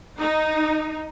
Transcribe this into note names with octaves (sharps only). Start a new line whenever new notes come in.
D#4